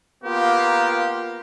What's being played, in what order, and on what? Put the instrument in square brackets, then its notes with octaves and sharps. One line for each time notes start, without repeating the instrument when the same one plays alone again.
[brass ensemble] A#3 B3 F4 G4